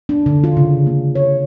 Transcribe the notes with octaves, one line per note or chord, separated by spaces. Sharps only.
D4
D3
F4
C#3
A#3
C#5